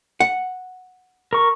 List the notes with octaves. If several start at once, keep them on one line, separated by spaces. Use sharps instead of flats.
F#5
A#4 C#6